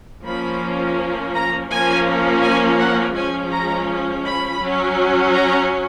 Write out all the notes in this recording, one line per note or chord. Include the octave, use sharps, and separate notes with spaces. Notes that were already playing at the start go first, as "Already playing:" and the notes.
F3 A#3 C#4 B5
A#5
F3 A#3 C#4 G#5
G#5
F#5
F3 G#3 C#4 G#5
A#5
B5
F#3 C#4
A#5